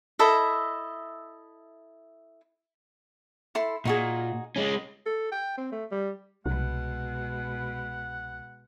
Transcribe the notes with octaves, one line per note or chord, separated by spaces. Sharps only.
E4 A4 D#5 E5
E4 A4 C6
A#2 D#4 F#4 G#4
G#3 C#4
A4
G5
C4
A3
G3
C2 B2 G#3 F#5